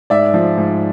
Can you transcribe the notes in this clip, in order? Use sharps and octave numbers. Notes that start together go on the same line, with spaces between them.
G#2 D5 E5
F3
G#2